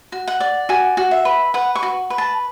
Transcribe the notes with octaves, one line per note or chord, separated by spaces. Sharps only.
F#4
F#5
D5
F#4 G#5
F#4
E5
B4
B4 F#5
C#6
F#4
B4
A5